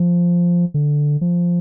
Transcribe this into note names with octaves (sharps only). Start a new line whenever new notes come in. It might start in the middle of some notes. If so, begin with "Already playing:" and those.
Already playing: F3
D3
F3